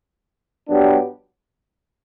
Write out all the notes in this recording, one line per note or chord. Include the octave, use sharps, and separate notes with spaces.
G2 F#3 B3 D4 G4